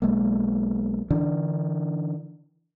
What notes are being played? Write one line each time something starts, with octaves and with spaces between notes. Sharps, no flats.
B1 G#3 A#3
D3 E3 D4